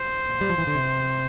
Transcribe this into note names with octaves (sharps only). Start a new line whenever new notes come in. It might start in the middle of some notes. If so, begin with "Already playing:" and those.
Already playing: C5
A#2
G3
F3
E3
D3
C3